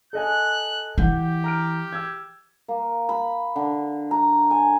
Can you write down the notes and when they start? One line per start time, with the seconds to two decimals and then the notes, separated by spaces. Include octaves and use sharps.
0.13 A4 D#5 G#5 F#6
0.98 E3 G4 F#5 G6
1.44 A#5 F6 D7
1.93 E6 G#6
2.68 A#3
3.09 B5
3.56 D3
4.11 A#5
4.51 G#5